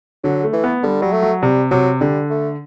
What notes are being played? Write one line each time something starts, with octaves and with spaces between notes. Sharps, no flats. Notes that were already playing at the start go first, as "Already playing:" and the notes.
D3 F#3
A3
E3
B3
D3 G3
F#3 G3
A3
F#3
C3 G3
C3 F#3
D3 G3
A3